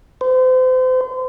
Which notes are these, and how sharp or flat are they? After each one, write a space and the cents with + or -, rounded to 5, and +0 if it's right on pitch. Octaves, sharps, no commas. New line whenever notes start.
C5 -35